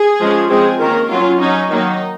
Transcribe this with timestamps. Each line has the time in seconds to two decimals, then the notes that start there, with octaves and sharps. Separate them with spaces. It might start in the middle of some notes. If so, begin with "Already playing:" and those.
Already playing: G#4
0.20 F3 G#3 C#4
0.50 F3 G#3 C4 G#4
0.80 D#3 A#3 C#4 A#4
1.10 F#3 C#4 F4
1.41 F#3 C#4 D#4
1.71 D#3 F#3 A#3 D#4